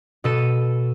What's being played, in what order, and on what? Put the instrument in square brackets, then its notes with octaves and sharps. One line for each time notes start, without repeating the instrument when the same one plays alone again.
[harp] B2 A4 D#7